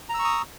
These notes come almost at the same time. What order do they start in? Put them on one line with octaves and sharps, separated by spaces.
A#5 E6 C#6 D#6